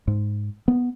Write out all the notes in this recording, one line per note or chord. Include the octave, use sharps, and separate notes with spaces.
G#2
B3